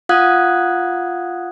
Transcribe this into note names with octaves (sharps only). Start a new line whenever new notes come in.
F4 F5 F#5 D#6 F#6 G#6